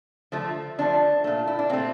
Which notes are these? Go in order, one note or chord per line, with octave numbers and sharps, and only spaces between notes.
D3 F3 A3
D3 F3 A3 D4
A#2 A3
E4
D4
A#2 A3 C4